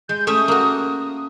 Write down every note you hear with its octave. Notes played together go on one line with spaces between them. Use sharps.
G#3 G6
A3 C#4 E5 D#6
A#3 F#4
D#6